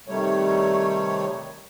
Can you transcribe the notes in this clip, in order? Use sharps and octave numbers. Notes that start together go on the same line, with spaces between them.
C3 D#3 G3 A3 C#5